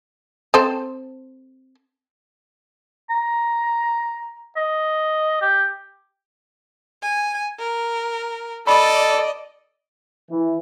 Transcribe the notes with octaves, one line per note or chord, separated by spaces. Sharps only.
C4 A4 C5
A#5
D#5
G4
G#5
A#4
A4 D5 D#5 B5
E3